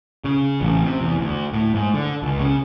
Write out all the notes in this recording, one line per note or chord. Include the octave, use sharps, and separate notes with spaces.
C#3
A1
C3
E2
D2
A2
G#2
D3
C#2
C#3